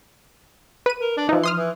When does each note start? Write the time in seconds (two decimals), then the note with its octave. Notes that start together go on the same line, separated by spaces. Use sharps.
0.86 B4 D#7
1.01 A#4
1.17 D4
1.29 E3 F3 D#4
1.44 C6 D#6 F6
1.56 E3